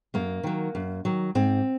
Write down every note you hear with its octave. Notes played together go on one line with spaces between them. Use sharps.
F#2 A#3
D#3 F#3
F#2
D#3 F#3
G#2 C4